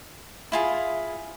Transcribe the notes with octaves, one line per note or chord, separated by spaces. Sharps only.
E4 F4 G#4